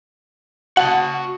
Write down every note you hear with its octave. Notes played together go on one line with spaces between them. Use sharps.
F#4 F#5 A5